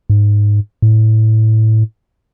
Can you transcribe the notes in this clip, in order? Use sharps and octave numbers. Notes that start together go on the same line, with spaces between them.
G#2
A2